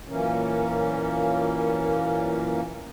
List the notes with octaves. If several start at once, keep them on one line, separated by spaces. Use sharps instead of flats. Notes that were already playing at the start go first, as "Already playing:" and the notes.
F#2 A#2 E3 A#3 C#4